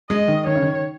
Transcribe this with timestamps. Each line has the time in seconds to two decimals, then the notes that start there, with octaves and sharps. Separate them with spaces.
0.10 G#3 D#5
0.28 D#3
0.46 D#3 C#5
0.55 C#3
0.62 D#3